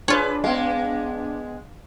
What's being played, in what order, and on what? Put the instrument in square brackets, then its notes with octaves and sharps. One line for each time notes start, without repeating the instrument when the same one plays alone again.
[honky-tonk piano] D4 [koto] F4 C#5 [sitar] G#4 B4
[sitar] G#3 B3 [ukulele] F5